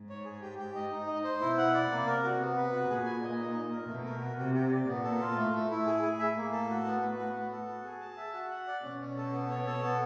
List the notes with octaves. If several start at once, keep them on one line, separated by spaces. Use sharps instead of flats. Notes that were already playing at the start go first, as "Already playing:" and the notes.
Already playing: G#2
C#5
G#4
G4
G4
D#5
D#4
D#5
C5
B2 E4
F#5
D5
C3 A#3
A#4
F#4
B3
B4
F#4
A#2 G#4
G#5
D#5
D#4
D#5
A#4
B2 A3
A#4
F#4
C3 G4
G4
D5
A#2 B3
A4
F4
A2 A3
A3
E4
A2 G#4
G#4
E5
A#3
A4
F#4
B3
B4
F#4
B3
A4
F#4
G#4
A5
E5
F#4
F#5
D5
B2 C#4
C#4
A4
B3
C#5
A4
B3